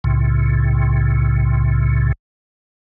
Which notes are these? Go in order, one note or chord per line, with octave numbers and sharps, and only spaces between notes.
C2 A2 C#3